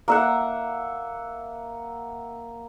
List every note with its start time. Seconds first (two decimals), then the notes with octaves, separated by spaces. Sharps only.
0.08 A#3 E5 F#5